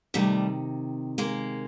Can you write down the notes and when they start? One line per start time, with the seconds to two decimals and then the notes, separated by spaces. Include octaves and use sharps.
0.14 C3 D#3 G3 A3
1.18 G#3 A#3